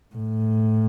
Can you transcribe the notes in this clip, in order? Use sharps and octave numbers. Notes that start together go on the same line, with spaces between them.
A2